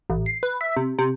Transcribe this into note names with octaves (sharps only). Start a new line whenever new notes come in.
A1
C7
B4
E5
C3
C3